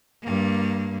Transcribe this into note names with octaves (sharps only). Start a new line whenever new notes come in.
G2 A#3